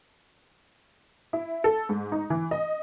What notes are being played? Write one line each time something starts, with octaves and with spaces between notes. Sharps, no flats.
E4
A4
G#2
D#4
E3
D#5